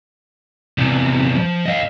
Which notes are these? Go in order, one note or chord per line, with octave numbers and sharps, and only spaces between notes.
E2 C3
F3
D#5 F5